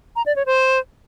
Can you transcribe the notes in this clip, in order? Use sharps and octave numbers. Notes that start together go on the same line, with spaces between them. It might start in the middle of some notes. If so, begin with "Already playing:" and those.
A#5
D5
C#5
C5